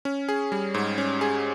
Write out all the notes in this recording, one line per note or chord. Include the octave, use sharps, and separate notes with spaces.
C#4
G#4
G3
G#2
C#4
G#4